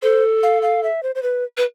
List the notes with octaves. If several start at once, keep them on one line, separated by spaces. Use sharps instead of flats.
A4 C5
F5
F5
E5
C5
C5
B4
B4